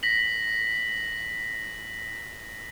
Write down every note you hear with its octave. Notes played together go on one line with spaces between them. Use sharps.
A#6 B6 F#7